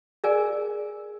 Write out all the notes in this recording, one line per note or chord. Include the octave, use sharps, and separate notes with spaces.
G#4 A#4 D5 G#5